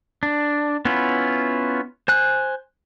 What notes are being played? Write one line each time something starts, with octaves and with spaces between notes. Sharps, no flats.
D4
B3 C#4 E4 F4
C5 G#5 F#6